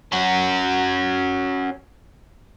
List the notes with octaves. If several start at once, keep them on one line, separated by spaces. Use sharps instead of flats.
C#4 F#4